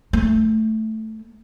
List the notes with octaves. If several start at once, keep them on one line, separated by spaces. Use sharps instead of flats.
A3